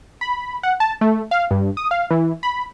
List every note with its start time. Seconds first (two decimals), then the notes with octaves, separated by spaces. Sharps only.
0.21 B5
0.63 F#5
0.80 A5
1.01 A3
1.31 F5
1.51 G2
1.77 D#6
1.91 F5
2.11 E3
2.43 B5